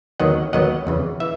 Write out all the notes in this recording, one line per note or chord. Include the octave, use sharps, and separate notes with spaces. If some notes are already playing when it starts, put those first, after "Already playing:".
D#2 D#3 F#3 B3 D#5 F#5
D#2 D#3 F#3 B3 D#5 F#5
E2 C#3 E3
E3 E5